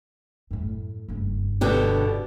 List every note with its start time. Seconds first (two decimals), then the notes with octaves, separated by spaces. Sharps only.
0.51 F#2 A2
1.08 F#1 G2
1.61 B2 D3 G4